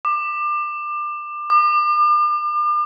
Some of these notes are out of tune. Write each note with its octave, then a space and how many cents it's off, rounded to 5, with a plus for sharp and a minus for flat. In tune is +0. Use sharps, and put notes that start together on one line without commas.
D6 +25
D6 +40